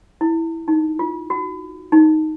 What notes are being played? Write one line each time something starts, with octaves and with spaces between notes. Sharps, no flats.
E4
D#4
F4
F#4
D#4